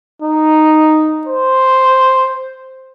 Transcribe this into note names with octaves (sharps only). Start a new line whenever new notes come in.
D#4
C5